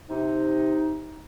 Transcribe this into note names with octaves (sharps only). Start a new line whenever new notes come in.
C3 D#4